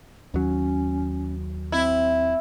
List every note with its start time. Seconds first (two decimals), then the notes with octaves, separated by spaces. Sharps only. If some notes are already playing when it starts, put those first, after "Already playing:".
0.34 D#2 F#3 C#4
1.72 C4 E4